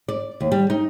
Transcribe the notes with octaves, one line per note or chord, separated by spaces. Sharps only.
D5
D#2
G3
D#4